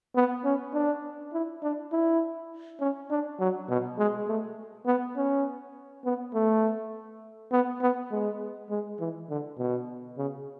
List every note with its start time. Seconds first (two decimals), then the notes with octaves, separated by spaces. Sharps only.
0.15 B3
0.44 C#4
0.74 D4
1.33 E4
1.63 D4
1.92 E4
2.80 C#4
3.10 D4
3.39 F#3
3.69 B2
3.98 G#3
4.28 A3
4.86 B3
5.16 C#4
6.05 B3
6.34 A3
7.52 B3
7.81 B3
8.11 G#3
8.70 G#3
9.00 E3
9.29 D3
9.58 B2
10.17 C#3